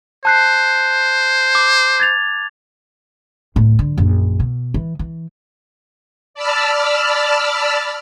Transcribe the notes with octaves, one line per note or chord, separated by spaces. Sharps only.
C5 A5 F#6 C7
D6
G#6 A6 F7
D1 A2
D3
A#1 F#2
B2
E3
E3
D5 A5 B5 E6 F6